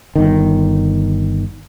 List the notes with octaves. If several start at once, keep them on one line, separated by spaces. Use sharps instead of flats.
G1 D#3